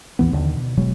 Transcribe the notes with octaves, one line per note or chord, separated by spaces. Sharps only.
A1 D#2 E3 B3
D#2 D3 D#3
B2
E1 B2 F#3 G#3